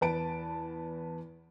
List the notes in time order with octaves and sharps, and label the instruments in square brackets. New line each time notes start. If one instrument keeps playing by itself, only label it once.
[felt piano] E2 B4 A5 D7